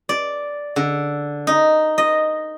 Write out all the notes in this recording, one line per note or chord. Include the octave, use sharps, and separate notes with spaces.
D5
D3
D#4
D#5